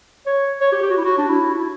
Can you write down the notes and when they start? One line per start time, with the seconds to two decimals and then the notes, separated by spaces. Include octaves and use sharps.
0.26 C#5
0.61 C#5
0.72 G4
0.82 G4
0.90 F#4
0.98 E4
1.04 F#4
1.18 D4
1.29 E4
1.54 E4